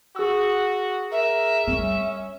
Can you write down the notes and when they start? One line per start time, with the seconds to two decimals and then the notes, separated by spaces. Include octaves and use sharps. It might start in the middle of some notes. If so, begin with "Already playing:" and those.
0.16 F#4 G#4 E6
1.11 A#4 E5
1.67 G3 C#4